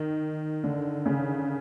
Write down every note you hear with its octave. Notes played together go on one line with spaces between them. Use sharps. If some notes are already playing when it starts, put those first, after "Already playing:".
Already playing: D#3
D3
C#3